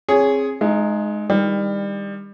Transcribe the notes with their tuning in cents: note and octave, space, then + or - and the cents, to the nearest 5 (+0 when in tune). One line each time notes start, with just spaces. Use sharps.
C4 +30 G#4 +0 C#5 +20
G#3 +20 D#4 -15 E5 +25
D#3 +25 G3 +30 D4 +35